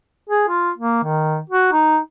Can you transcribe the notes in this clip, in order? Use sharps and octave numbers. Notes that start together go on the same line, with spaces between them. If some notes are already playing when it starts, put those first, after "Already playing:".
G#4
F4
A#3
D#3
F#4
D#4